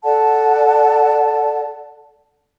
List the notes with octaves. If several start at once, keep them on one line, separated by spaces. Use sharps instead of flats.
A4 D5 F#5 A5